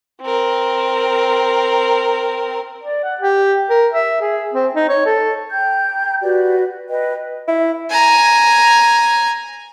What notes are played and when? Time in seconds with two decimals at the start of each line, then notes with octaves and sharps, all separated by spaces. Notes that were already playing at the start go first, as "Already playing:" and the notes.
0.21 C4 A#4
2.83 D5
3.04 F#5
3.21 G4
3.70 A#4
3.93 E5
4.21 G#4
4.54 C4
4.75 D#4
4.89 C#5
5.06 A4
5.51 G5 A#5 G6
6.22 F#4 G4 B4 D5
6.89 B4 D#5 G5
7.48 E4
7.90 G#5 A#5